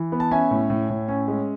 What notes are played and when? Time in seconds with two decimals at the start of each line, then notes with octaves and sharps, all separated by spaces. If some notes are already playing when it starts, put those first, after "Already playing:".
Already playing: E3
0.12 B3
0.20 A5
0.31 C#4 E5 G#5
0.51 A2
0.70 A2
0.90 A2
1.08 C#4
1.28 G#3